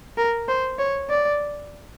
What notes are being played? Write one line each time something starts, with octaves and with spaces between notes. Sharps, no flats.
A#4
C5
C#5
D5